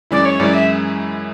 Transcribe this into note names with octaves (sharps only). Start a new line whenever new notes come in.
F#2 E3 G#3 C#4 E4 D5
C#5
F#2 E3 G#3 C#4 E4 D5
E5